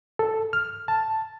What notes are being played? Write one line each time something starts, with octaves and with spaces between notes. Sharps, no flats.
A4
F6
A5